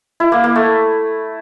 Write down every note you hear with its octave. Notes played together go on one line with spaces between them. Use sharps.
E4
A#3
A#3
A3